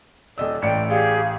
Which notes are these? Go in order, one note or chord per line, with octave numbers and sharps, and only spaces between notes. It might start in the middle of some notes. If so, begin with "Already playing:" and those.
D#1 D5 D#5 E6
A1 D5 G5 C#7
G4 G#4 F5